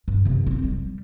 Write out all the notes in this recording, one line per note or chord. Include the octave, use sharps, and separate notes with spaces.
G2
F#2 C3
C4
G3